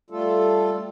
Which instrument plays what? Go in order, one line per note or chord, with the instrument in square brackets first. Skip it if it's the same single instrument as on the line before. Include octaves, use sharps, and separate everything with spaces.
[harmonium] G3 A3 F4 A4